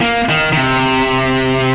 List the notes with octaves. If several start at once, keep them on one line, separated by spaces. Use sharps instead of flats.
A#3
D#3
D#3
C3